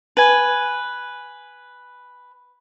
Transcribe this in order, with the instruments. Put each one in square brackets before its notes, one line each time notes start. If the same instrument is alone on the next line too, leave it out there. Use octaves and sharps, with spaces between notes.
[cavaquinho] B4 G#5